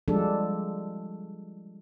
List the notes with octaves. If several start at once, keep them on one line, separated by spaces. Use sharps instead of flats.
F3 G3 G#3 D4 A4